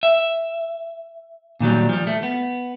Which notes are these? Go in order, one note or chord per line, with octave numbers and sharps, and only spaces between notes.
E5
A#2 D#3 F#3 G3
F3 G3
A3
B3